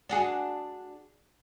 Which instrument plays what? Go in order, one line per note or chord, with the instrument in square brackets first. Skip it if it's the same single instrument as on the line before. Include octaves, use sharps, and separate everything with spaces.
[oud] D4 F#4 G#4